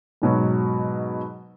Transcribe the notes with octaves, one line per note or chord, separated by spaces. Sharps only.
G#2 B2 F#3